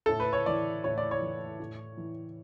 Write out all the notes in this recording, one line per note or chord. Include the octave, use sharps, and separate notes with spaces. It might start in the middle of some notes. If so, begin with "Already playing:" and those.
A2 A4
B4
C#5
E3 D5
A2 C#5
D5
C#5
E3
A2
E3